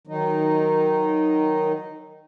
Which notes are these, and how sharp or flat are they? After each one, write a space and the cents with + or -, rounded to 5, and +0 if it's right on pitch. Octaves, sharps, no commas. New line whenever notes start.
D#3 +0 F#3 +0 D#4 -10